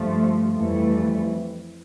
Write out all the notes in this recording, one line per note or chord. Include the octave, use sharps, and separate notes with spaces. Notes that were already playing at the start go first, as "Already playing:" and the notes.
Already playing: G2 F3 A3
F2 E3 G3 A3